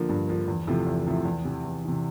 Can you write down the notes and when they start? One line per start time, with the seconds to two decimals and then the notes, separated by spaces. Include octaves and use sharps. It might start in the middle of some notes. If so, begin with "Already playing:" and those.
Already playing: D3 F3 A#3
0.09 G2
0.28 D3 F3 A#3
0.48 E2
0.67 C3 F3 A3 E4
0.87 E2
1.07 C3 F3 A3 E4
1.25 E2
1.45 C3 E3
1.65 E2
1.84 C3 E3